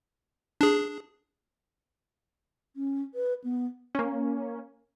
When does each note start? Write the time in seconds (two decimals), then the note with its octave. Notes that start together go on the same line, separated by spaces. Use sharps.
0.61 D4 G#4
2.76 C#4
3.14 B4
3.44 B3
3.95 A#3 C#4